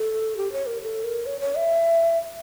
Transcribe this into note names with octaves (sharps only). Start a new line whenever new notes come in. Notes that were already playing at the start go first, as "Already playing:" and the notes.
Already playing: A4
G4
C#5
A#4
A4
A#4
C#5
C#5
E5